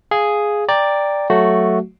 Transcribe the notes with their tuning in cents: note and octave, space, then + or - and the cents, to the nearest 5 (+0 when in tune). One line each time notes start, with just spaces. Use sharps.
G#4 +0 F5 +0
D5 +0 G5 +15 A#5 -5
F#3 +0 A3 +0 F#4 +0